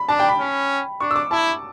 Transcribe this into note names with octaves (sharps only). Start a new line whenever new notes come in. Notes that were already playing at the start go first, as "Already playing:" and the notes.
Already playing: B5
D4 A5
G5
B5
C#4
D4 C#6
E6
D6
E4 A5